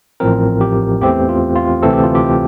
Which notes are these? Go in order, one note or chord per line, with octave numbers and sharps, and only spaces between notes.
A1 A2 F3 C4 A#4
G4
E2 E3 A3 C4 G4
F4
F4
D2 C3 E3 A3 C4 A4
G4
F4
G4